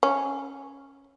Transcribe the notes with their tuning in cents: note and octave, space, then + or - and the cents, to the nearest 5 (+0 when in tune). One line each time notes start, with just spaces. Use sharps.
C#4 -5